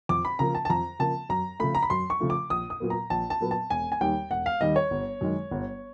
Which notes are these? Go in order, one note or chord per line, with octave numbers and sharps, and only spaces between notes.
F2 D6
B5
C#3 F3 A#3 A#5
A5
A5
F2 A#5
C#3 F3 A#3 A5
F#2 A#5
C#3 F3 A3 B5
A#5
B5
F#2 C6
C#6
C#3 F3 A3
D6
A#1 D#6
D#6
A#2 F#3 B3
A#5
A#1 A5
A5
A#2 F#3 B3
A5
E1 G#5
G#5
D#2 D#3 G3 G5
E1 F#5
F5
D#2 D#3 G3 D#5
C#5
G1
F#2 D#3 G#3
G1